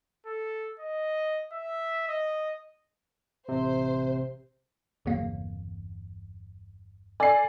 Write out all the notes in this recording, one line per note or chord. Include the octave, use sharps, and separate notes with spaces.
A4
D#5
E5
D#5
A1 C3 C5
G1 E2 C#3 F#3 A#3
A4 D5 G#5 C7